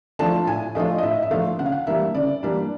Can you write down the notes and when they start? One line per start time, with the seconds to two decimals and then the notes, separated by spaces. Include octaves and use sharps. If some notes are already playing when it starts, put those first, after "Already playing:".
0.19 F3 A3 D4 F4 A5
0.47 A2 G#5
0.75 F3 A3 D4 F4 D#5
0.98 D#5
1.03 A2 E5
1.23 E5
1.31 F3 A3 D4 F4 F5
1.59 C#3 F#5
1.66 F5
1.72 F#5
1.87 E3 G3 A#3 D4 E5
2.15 C#3 D5
2.43 E3 G3 A#3 D4